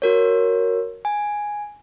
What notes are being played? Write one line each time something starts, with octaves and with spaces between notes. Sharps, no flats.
F#4 A#4 C#5
G#5